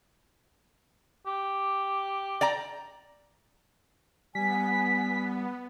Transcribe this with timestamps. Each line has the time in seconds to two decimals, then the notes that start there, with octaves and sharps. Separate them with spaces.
1.26 G4
2.41 D5 G5 A#5
4.35 G3 B3 G#5 B6